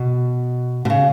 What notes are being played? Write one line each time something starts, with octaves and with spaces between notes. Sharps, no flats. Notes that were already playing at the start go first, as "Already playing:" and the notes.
Already playing: B2
B2
C#3